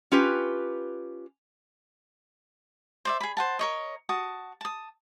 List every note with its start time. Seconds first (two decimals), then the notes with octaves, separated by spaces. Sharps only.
0.12 C#4 F4 G4 B4
3.05 C5 D5 E5
3.20 G#4 B5
3.37 C5 F#5 A5
3.59 A#4 C#5 D#5
4.09 F#4 A5 D#6
4.61 A5 D#6